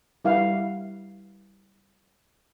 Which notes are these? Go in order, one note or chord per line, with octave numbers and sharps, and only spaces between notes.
G3 E4 B4 F5 F#5